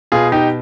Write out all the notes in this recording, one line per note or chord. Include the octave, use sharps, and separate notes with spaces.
B2 F4 G#4
D#4 G4